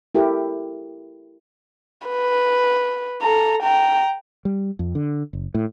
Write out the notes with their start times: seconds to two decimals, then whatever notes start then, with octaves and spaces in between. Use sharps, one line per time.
0.15 E4 G4 A4 A#4
2.08 B4
3.22 A4 A#5
3.63 G5 A#5
4.45 G3
4.79 F2
4.95 D3
5.33 F#1
5.55 A2